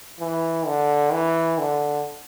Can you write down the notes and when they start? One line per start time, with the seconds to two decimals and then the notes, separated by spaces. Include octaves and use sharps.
0.20 E3
0.66 D3
1.12 E3
1.59 D3